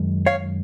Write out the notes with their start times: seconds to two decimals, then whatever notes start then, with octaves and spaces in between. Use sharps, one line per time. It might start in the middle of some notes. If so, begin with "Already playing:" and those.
Already playing: F#2 D#3 G#3
0.26 C#5 F5